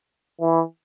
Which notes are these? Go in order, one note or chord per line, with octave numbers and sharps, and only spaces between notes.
E3